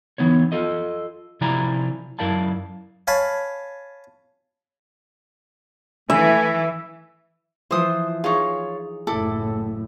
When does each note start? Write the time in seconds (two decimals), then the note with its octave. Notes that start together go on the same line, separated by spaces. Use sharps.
0.18 E3 B3 D#4 C#5
0.52 F4 A4 D#5
1.41 C3 F3 E4 D5 G#5 A#5
2.19 F#2 E4 A#4 D5 F5 A5
3.07 C#5 F5 G#5 A5 B5
6.10 E3 A3 E5 G#5
7.71 E3 F3 C5 D#6
8.24 D#4 F4 G#4 C#5
9.07 F#1 A2 E4 A4 D6